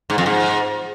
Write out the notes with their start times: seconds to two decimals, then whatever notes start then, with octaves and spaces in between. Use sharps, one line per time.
0.10 G#2
0.18 F2
0.26 G#2